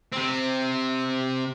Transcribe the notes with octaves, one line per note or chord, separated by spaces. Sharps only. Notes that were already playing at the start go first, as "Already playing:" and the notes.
C3 C4